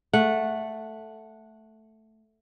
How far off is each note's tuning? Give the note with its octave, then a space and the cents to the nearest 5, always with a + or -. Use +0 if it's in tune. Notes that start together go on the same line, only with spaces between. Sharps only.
A3 +0 F#5 -10